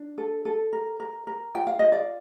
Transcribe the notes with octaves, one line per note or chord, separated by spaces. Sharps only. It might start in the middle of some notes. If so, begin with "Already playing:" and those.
Already playing: D4
A4
A4
A#4
A#4
A#4
F4 G5
F5
F4 D#5
D5 F5